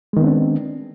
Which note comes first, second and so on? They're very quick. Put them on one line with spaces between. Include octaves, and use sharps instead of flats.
G#3 D#3 B3 C4 D4